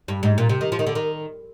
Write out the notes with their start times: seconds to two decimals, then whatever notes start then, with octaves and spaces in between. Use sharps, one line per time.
0.08 G2
0.23 G#2
0.38 A#2
0.49 C3
0.61 D#3
0.72 F3
0.79 D#3
0.87 D3
0.95 D#3